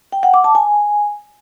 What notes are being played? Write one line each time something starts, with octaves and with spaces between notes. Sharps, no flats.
G5
F#5
D6
A5
G#5